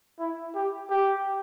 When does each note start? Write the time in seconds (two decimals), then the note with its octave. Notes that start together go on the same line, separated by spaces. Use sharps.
0.19 E4
0.55 G4
0.90 G4